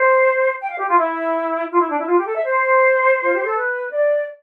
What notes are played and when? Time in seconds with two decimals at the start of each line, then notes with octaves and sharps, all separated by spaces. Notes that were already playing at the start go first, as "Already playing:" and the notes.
Already playing: C5
0.61 G5
0.70 F5
0.79 G4
0.88 F4
0.98 E4
1.71 F4
1.80 E4
1.89 D4
1.99 E4
2.07 F4
2.17 G4
2.26 A4
2.36 E5
2.44 C5
3.22 F4
3.32 G4
3.44 A4
3.55 B4
3.92 D5